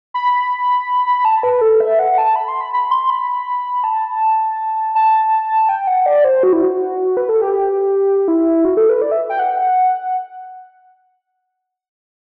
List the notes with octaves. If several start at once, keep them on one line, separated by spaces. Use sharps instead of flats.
B5
A5
B4
A4
E5
F#5
A5
B5
C6
B5
B5
C6
B5
A5
A5
G5
F#5
D5
C5
F#4
E4
F#4
B4
A4
G4
E4
F#4
A4
B4
D5
E5
G5
F#5